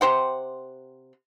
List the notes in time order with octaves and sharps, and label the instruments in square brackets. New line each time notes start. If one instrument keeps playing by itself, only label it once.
[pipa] C3 G4 C5 F#5